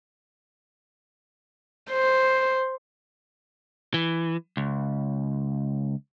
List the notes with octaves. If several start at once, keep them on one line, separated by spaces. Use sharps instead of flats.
C5
E3
C#2